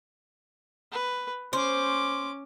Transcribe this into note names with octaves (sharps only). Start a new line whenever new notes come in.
B4
C#4 C5 D6